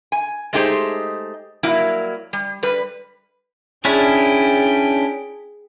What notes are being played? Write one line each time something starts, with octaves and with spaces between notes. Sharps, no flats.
G#5
G#3 A3 D#4 G4 G#4 C5
F#3 G3 A#3 E4
G3
G3 B4
C#4 D4 E4 G#4 G5